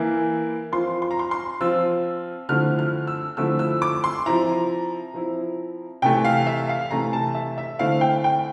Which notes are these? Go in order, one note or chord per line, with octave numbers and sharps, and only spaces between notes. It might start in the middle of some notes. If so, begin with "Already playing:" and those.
Already playing: E3 A#3 E4
F3 C4 F4 C6
C6
A#5
C6
C6
F3 C4 F4 E6
D3 F3 A3 C4 E4 F6
F6
E6
D3 F3 A3 C4 E4 E6
E6
D6
C6
F3 C4 E4 A#5
F3 C4 E4
C3 E3 A3 G5
F5
E5
F5
C3 E3 A3 A#5
A5
E5
E5
D3 A3 C4 E4 F5
G5
G5